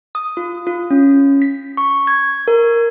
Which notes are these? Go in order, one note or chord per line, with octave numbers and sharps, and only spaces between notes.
D#6
F4
F4
C#4
B6
C#6
G#6
A#4